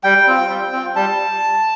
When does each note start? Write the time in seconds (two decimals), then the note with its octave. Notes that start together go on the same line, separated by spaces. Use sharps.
0.04 G3 G5
0.27 C4 F4
0.50 G3
0.72 C4 F4
0.95 G3 A5